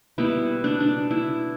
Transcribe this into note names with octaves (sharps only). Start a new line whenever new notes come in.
B2 G3 B3 E4
D4
D4
E4